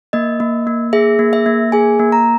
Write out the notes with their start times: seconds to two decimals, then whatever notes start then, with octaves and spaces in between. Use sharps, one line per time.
0.13 A#3 D#5
0.40 A#3
0.67 A#3
0.93 G#4 E5
1.19 A#3
1.33 E5
1.46 A#3
1.72 G#4 G#5
1.99 A#3
2.12 A#5